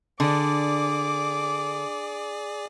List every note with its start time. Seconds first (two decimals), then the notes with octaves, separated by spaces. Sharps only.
0.20 D3 G#4 D5 D6